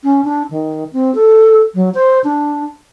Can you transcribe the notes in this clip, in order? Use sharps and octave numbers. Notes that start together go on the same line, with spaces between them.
C#4
D4
D#3
C4
A4
F#3
C5
D4